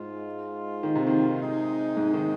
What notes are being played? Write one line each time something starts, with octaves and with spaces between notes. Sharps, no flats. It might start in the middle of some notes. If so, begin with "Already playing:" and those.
Already playing: G#2 G#3 F4
D#3
C3
D#3
C3 G#3 D#4
G#2
D#3